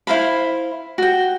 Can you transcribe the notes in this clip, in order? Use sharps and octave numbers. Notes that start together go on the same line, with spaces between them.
E4 C5 F5 B5
F#4 G5